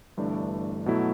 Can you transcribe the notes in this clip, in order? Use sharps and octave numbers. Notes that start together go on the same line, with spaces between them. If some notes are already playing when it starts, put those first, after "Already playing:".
G1 G2 E3 A3 D4
B2 F#3 A3 E4